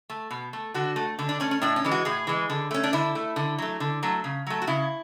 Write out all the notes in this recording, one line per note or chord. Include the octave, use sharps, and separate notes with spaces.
A3
B2
A3
D3 F#4
A3
D3
D4
A3 C#4
C#4
A2 D4
C#4
E3 G#3
F#4
A2 G#4
E3 G#3
D3
A3 C#4
D4
D3 E4
A3
D3
F#3 A3
D3
F#3 A3
C#3
F#3 A3
F#4
C#3 E4